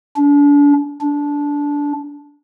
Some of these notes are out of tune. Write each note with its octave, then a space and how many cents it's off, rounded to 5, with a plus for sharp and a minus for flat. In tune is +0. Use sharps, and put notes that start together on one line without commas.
D4 -35
D4 -15